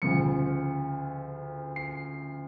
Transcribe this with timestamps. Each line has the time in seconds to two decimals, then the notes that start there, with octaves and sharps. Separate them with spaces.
0.02 D2 C#3 F3 C#7
1.76 C7